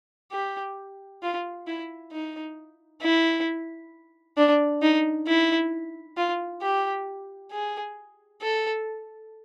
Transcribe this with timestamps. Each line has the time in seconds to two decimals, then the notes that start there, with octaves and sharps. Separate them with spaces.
0.32 G4
1.23 F4
1.68 E4
2.12 D#4
3.02 E4
4.37 D4
4.82 D#4
5.28 E4
6.17 F4
6.62 G4
7.52 G#4
8.42 A4